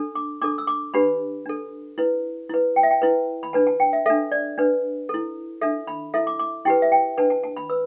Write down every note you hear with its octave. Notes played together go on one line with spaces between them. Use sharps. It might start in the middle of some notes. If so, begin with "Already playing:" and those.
Already playing: D4 A4
D6
D4 A4 D6
E6
D6
D4 G4 B4 B5
D4 A4
E4 B4
E4 B4
G5
E5
G5
E4 B4
B5
D4 B4 A5
A5
G5
E5
D4 A4 E5
D5
D4 B4
E4 A4
D4 A4 E5
B5
E4 A4 E5
D6
D6
E4 G4 B4 G5
E5
G5
D4 B4 A5
A5
A5
B5
B4 E6